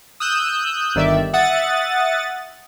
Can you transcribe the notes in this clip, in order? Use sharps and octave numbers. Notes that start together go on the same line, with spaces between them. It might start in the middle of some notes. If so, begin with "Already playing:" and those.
D#6 E6 F#6 G6
G1 D#3 D5 E5
E5 F#5 D#6 A6